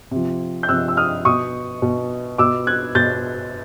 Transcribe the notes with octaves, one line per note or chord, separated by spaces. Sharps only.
C3 F3
G6
C3 F3 E6 F#6
E6
D#6 F6
B2 C#6 D#6
B2
B2 D6 E6
F#6 G#6
B2 G6 A6